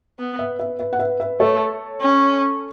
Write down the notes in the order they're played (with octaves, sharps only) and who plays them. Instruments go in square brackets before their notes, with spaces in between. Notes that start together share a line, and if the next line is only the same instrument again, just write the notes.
[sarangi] B3
[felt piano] B4 E5
B4 E5
B4 E5
F#5
B4 E5
B4 E5
[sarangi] A3 [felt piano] A4 C#5
[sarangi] C#4